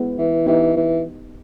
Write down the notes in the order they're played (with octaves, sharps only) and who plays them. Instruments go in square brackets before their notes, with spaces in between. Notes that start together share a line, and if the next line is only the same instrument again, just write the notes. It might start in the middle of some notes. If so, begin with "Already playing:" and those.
Already playing: [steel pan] G#3 B3 E4
[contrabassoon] E3
[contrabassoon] E3 [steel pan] B3 D#4 G4
[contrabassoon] E3